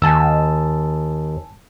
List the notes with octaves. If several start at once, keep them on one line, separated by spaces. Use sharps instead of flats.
D#2 G#5 A5 E6